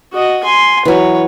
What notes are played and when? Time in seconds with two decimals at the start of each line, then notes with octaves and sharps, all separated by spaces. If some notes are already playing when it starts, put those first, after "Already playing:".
0.13 F#4 D#5
0.43 G#5 C6
0.85 E3 F#3 B4 C#5